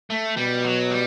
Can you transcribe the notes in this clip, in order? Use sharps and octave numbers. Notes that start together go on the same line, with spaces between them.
A3
B2 G3
F#3
G3